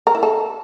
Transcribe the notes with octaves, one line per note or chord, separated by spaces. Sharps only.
A#4
E4
A4